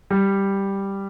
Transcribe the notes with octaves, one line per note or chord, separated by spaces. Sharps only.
G3